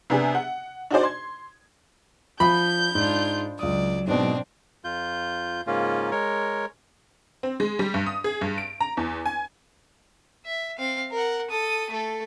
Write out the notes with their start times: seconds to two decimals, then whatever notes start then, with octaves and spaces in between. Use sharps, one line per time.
0.10 C3 B3 D4 G#4
0.35 F#5
0.91 D4 D#4 F#4 G#4 C5 D5
1.03 C6 G#6
2.40 F3 B5 G6
2.95 G#2 D4 F4
3.59 C#2 F#3 D5 D#6
4.07 G#2 B2 C4 D4
4.84 F2 F4 G6
5.67 G#2 C#3 A#3 C#4 F4
6.11 G#3 A#4 C#5
7.43 C4
7.60 G#3
7.79 G3
7.94 G2
8.06 D#6
8.24 G#4
8.41 G2
8.58 D7
8.80 A#5
8.97 E2
9.26 G#5
10.46 E5
10.79 C4 F5
11.12 A#4 F#5
11.50 A4 D#6
11.91 A3 A4